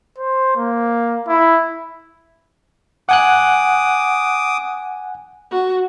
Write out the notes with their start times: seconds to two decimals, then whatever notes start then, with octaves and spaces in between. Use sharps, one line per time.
0.18 C5
0.56 A#3
1.28 E4
3.09 F#5 G#5 D6 D#6 F#6
5.51 F#4